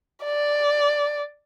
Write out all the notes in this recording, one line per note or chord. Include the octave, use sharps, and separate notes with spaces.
D5